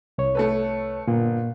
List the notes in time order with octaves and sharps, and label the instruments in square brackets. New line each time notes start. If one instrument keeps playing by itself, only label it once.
[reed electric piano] C2 C#5
[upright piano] A3 A4 B4
[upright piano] G1 [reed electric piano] A#2